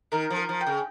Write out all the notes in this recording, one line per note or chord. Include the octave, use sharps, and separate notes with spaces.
D#3 A#4
F3
A#4
F3
G5
C#3